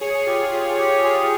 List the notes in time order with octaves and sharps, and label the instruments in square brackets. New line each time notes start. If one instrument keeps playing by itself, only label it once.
[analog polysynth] G#4 [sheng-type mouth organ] C#5
[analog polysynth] G#4
[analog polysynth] F4 [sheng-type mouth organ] G4
[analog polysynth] F4 [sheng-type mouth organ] C#5
[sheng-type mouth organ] G4
G#4